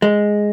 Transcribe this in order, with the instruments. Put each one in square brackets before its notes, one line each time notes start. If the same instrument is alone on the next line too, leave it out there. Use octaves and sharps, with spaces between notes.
[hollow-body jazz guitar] G#3